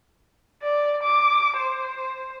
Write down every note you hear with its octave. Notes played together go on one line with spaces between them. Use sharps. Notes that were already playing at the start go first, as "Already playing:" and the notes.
D5
D6
C5